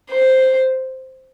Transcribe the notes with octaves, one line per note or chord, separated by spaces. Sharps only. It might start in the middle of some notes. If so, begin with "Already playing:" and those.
C5